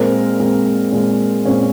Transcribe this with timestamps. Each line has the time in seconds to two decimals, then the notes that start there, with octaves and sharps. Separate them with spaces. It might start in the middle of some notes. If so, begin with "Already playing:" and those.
Already playing: A#2 G#3 C4 A#4
0.39 A#2 G#3 C4
0.92 A#2 G#3 C4
1.45 A#2 G#3 C4 C#4